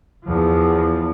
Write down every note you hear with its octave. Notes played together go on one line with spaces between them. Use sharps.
E2 F3